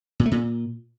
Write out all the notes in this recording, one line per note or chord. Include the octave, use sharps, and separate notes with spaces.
A#2
A3
A#2